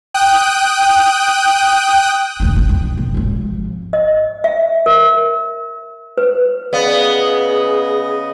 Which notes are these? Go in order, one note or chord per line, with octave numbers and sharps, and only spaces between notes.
G5 D#6 F#6
D1 D3
F#1 B2
F2
B2
G#1 F3
D#5
E5
A#4
B4
C#3 B3 G#4 D5 D#5 F5